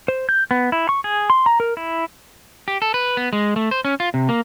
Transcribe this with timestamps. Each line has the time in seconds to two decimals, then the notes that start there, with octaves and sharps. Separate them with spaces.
0.08 C5
0.29 G6
0.51 B3
0.72 E4
0.89 C#6
1.04 G#4
1.30 C6
1.46 A#5
1.60 A#4
1.77 E4
2.68 G4
2.82 A4
2.94 B4
3.17 B3
3.33 G#3
3.56 A3
3.71 C5
3.85 C#4
4.00 F4
4.14 C3
4.29 A#3